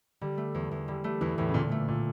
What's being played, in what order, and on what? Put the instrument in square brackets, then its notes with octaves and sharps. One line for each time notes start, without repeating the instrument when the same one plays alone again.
[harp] D3 [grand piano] G3
[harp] A3
E2
E2
[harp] D3 [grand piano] G3
[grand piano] G3 [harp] A3
[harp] E2 [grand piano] E3
[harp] E2 [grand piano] A2
[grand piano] C#3
[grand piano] A#2 [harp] D3
[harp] A3
[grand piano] A#2